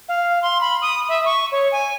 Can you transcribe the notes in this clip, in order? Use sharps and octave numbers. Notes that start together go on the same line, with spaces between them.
F5
C6
B5
D#6
E5
C#6
C#5
G#5